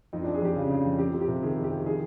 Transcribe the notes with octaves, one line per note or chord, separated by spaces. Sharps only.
F2 D#4
F2 D4
G#4
F2 G4
C#3
C#3
F2
F2 G4
F2
G4
C3
D#3 G#4
F2
G4
F2
D#3 G#4